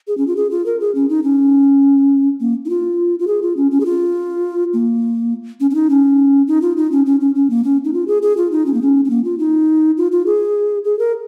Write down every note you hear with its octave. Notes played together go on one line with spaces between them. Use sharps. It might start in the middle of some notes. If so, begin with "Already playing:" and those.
G#4
C#4
F4
G#4
F4
A#4
G#4
C#4
D#4
C#4
A#3
D#4
F4
F4
G#4
F4
C#4
C#4
G#4
F4
A#3
C#4
C#4
D#4
C#4
D#4
F4
D#4
C#4
C#4
C#4
C#4
A#3
C#4
D#4
F4
G#4
G#4
F4
D#4
C#4
A#3
C#4
C#4
A#3
F4
D#4
F4
F4
G#4
G#4
A#4